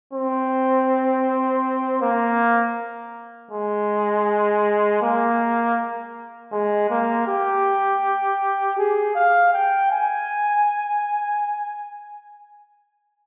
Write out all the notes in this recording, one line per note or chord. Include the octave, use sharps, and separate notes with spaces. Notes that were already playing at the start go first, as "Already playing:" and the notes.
C4
A#3
G#3
A#3
G#3
A#3
G4
G#4
F5
G5
G#5